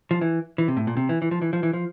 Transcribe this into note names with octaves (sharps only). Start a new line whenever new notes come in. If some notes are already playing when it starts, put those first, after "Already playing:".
F3
E3
E3
C3
A2
A#2
C3
E3
E3
F3
E3
F3
E3
F3